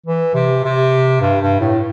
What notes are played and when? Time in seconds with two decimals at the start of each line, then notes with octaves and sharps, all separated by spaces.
0.06 E3
0.34 C3
0.64 C3
1.21 G2
1.41 G2
1.60 A2